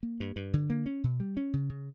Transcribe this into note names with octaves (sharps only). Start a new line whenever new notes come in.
A#3
G2
G2
D3
A#3
C#4
B2
G3
C#4
C#3
C#3